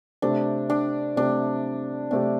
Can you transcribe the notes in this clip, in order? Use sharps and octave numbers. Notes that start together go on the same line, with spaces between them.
C3 A3 C4 D4 G4
D4
C3 A3 C4 D4 G4
C3 A3 C4 D4 G4